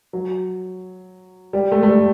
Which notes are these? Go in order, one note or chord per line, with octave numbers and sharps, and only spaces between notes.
F#3
G3
A3
A3
G3